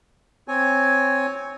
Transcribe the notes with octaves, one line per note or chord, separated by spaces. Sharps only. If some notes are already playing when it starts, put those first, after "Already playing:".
C4 C#5 G#5